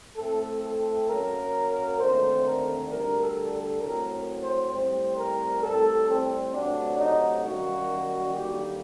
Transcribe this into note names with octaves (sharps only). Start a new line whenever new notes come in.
A2 A3 C4 A4
A4
F#2 F#3 A#3 A#4
D#2 D3 A3 C4 C5
A#4
D2 D3 G3 A#4
A4
A4
A2 F#3 C4 A#4
C5
A2 G3 C4 C5
A#4
A2 G3 C4 A4
C4
D2 C3 F#3 A3 D4
D#4
F#2 D#3 G3 A#3 F#4
D#2 D3 G3 A#3 G4